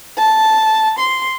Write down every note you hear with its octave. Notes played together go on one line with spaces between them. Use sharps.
A5
C6